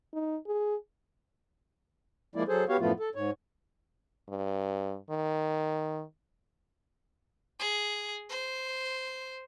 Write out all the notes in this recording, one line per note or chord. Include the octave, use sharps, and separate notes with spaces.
D#4
G#4
F3 G#3 A#3 E4 D5
F#3 G#4 A4 C5
B3 F#4 G4 C#5 F5
F#2 A2 F3 A3 B3 F4
A4
G#2 C#5
G2
D#3
G#4
C5